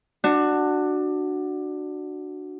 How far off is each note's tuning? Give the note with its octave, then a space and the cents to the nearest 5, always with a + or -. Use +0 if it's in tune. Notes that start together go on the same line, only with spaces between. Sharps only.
D4 +15 F#4 +0